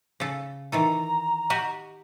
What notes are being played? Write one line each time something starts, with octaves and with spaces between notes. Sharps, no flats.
C#3 A4
D#3 E3 A4 A#5
F#4 G4 D#5